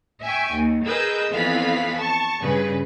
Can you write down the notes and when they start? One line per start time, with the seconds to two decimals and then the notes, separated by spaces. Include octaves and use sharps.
0.25 E5 G5 G#5 C#6
0.54 D#2
0.86 G#4 A#4 B4 D#5 E6 G6
1.31 F2 E3 B3 F5 B5 B6
1.98 A5 C#6
2.40 G2 C#3 G#4 B4